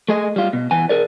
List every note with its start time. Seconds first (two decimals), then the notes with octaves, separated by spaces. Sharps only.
0.09 A3 G#4 D#5
0.36 G3 F4
0.53 B2
0.71 E3 B3 G#5
0.89 G#4 A#4 D5